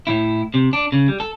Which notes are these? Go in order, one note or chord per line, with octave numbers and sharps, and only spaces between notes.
A2 E4
C3
D4
C#3
G3
A4